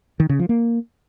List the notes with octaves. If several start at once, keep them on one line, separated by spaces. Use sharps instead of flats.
D#3
C#3
F3
A#3